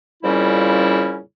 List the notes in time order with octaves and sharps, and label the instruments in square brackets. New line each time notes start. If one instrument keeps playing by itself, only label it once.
[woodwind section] F2 A#2 C#3 G3 C#4 E4